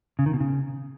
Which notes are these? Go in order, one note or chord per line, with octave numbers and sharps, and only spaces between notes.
C#3
D#3
B2
C#3